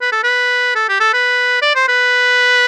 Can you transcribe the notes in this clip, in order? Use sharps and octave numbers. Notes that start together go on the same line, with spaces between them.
B4
A4
B4
A4
G4
A4
B4
D5
C5
B4